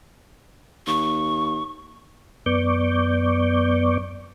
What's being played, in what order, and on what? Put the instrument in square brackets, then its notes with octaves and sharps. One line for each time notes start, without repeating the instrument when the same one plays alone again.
[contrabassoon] D#2 [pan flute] C#6
[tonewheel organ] F#2 B3 D5 C#6 D6 G6